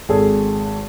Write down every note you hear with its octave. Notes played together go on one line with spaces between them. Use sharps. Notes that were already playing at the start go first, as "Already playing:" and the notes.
G#1 G#4 A4